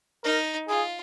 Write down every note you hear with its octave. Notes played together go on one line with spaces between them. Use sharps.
D#4 A#4
F4 G#4